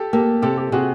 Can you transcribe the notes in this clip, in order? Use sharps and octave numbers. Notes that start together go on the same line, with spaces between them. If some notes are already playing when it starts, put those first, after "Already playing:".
Already playing: G4 A4
A#3 G4 A4
C3 G4 A4
G4 A4
C3 F#4 G#4